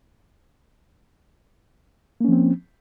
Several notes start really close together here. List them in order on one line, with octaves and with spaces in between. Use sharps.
A#3 C#4 F3 C4